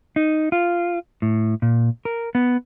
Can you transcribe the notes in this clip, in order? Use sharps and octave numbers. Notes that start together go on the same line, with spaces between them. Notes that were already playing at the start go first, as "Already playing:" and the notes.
D#4
F4
A2
A#2
A#4
B3